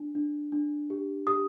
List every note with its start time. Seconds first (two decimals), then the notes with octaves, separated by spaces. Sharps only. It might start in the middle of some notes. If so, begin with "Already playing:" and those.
Already playing: D4
0.15 D4
0.52 D4
0.90 G4
1.27 G4 D#6